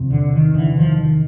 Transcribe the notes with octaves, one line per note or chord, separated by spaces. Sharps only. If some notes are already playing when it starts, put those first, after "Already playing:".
Already playing: E2 C3
D3
D#3
D3 E3
D#3 F3
D#3